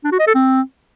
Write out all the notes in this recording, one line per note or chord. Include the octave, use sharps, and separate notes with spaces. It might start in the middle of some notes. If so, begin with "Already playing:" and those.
D4
F#4
D#5
A4
C4